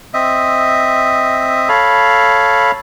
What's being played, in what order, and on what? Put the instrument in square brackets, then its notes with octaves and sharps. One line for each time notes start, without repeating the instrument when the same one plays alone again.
[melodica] C4 D#5 E5
A4 C#5 F5 B5